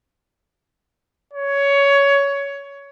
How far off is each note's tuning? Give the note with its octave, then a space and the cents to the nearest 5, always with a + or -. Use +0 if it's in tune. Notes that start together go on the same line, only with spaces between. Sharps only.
C#5 +15